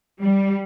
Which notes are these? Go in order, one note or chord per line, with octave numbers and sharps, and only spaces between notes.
G3